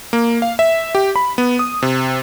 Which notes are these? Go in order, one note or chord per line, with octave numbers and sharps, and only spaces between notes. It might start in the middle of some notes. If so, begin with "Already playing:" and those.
A#3
F5
E5
G4
B5
B3
D#6
C3